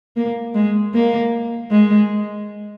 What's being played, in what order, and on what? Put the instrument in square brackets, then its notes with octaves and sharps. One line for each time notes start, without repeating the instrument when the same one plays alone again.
[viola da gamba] A#3
G#3
A#3
G#3